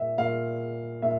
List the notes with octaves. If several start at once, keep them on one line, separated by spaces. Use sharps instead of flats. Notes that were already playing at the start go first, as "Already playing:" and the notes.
Already playing: A#2 E5
A#2 F5
A#2 E5